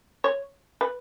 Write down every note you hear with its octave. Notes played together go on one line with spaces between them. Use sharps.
C#5
B4